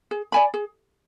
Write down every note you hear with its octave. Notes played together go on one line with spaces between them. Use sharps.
G#4
D5 G#5 B5
G#4